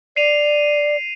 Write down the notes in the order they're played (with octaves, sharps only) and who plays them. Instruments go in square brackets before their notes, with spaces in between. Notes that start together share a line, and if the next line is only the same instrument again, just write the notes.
[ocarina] D5 [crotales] C7 D#7 F7